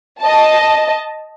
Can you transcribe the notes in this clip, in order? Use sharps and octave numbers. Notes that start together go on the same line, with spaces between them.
D#5 A5